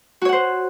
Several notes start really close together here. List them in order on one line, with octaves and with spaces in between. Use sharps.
F#4 C#5 F#5 C5